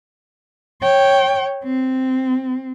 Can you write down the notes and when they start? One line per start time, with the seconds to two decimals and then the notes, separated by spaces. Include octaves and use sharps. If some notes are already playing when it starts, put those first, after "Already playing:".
0.82 C#5 G5
1.64 C4